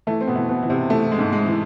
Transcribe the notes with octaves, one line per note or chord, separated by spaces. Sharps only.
E3 A3
C4
B2 B3
E3
B2 B3
E3
C3 C4
E3 A3
G#3
G#2
G#3
E3